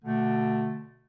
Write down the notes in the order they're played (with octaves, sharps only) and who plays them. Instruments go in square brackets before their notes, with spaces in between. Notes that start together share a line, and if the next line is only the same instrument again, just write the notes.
[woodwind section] B2 D3 [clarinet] A3